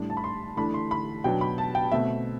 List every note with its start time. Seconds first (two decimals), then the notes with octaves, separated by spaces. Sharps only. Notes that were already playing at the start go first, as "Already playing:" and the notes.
Already playing: A2 G3 D4
0.10 A5
0.17 B5
0.24 C6
0.57 E3 A3 D4 B5
0.74 C6
0.91 B5
1.24 B2 F#3 B3 D4 G5
1.41 B5
1.58 A5
1.75 G5
1.92 B2 A3 C4 E5